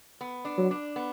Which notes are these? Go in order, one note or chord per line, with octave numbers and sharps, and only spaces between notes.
B3
D4
F#3
D4
B3